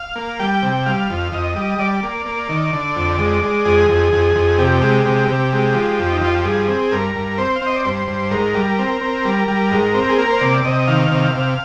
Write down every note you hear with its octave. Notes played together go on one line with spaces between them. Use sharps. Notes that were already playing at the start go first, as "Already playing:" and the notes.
Already playing: F5
A#3
G3 G5
C3
G3 F5
F2
F2 D#5
G3
G3 D5
A#3
A#3
D#3
D3
F2
G#3
G#3
F2 G#4
F2
F2
F2
C3 G4
G#3
C3
C3
G#3
F3
F2
D#4
F3 F4
G4
G2 G#4
C4
G2 A#4
G2
C4 C5
F5
C4 D#5
D5
G2 C5
G2
G#2 A#4
G3
C4
C4
G3
G3
G#2
C4
G#4
A#3 A#4
C5
C3 D5
C3 D#5
D#3 F5
C3
C3